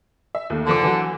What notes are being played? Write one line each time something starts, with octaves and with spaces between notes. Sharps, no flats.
E5
D#2 A3
F#1 D3 F3 D6
E3 F#3